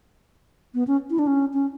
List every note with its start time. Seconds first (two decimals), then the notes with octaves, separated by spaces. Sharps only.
0.74 B3
0.87 C#4
1.10 E4
1.19 D4
1.27 C#4
1.54 C#4